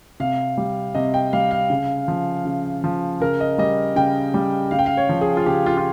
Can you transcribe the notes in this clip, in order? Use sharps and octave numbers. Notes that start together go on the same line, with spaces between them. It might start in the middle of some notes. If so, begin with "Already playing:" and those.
C3 F5
G3
C3 D#5
G5
G3 F5
F5
C#3
F3
C#3
F3
C#3 A#4
D#5
G3 D#5
C#3 G5
G3
C#3 F5
G5
F5
C#5
F3
G#4
F4
C#3 G4
F4
F4